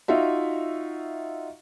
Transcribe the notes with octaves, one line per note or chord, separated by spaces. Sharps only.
D#4 F4 F#4 E5